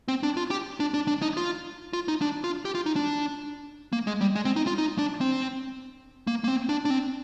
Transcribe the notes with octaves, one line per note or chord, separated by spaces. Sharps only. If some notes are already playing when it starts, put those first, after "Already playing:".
C4
D4
F4
G4
D4
D4
D4
D#4
F4
F4
D#4
D4
F4
G4
F4
D#4
D4
A#3
G#3
G3
G#3
C4
D#4
F4
D#4
D4
C4
A#3
A#3
C4
D4
D4
C4